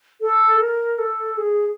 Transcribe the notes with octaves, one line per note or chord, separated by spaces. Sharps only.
A4
A#4
A4
G#4